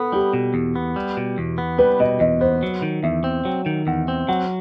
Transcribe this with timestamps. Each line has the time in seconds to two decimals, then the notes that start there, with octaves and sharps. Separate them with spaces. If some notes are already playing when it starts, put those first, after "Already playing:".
Already playing: B3 A4
0.12 G3 G4
0.33 B2
0.54 E2
0.76 B3
0.96 G3
1.17 B2
1.38 E2
1.58 B3
1.78 G3 B4
2.00 B2 D#5
2.20 E2 D#5
2.41 B3 C5
2.63 F#3
2.82 D#3
3.03 E2 E5
3.24 C4
3.45 F#3 G5
3.66 D#3
3.87 E2 F#5
4.08 C4
4.28 F#3 F#5